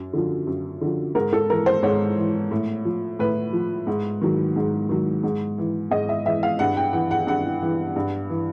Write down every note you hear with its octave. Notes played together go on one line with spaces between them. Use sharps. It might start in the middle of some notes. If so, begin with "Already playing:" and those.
Already playing: F#2
D3 F3
F#2
D3 F3
G#2 A#4
A4
E3 A#4
C5
G#2 C#5
E3
A2
F3
A2 B4
F3
G#2
D#3 F#3
G#2
D#3 F#3
G#2
E3
G#2 D#5
E5
E3 E5
F5
G2 F#5
G5
E3 F#5
F#5
G2 F#5
E3
G2
E3